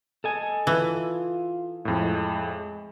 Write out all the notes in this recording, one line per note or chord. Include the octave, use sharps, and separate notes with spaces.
A4 D#5 G#5
E3 F4
F2 A2 G#3
G#3